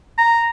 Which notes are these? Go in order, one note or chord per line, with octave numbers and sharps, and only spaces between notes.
A#5